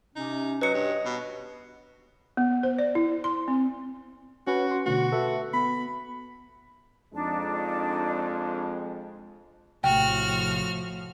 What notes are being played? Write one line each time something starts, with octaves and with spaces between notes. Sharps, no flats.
C3 C#4 D#4
F#3 B4 C#5 D#5 C#7
G2
B2
B3
C5
D5
E4
C6
C4
C#4 F#4 B4
C6
B2 D3 A3 F#4
A4 B4 E5
B3 B5
F2 G#3 D4 D#4 A5
A#1 A2 C3 F3 F#4 G5 F6